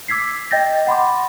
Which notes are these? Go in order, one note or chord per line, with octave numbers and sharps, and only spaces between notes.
D6 E6 G#6 B6 C7
D#5 G5 G6 A6 A#6
F#5 B5 C6 D6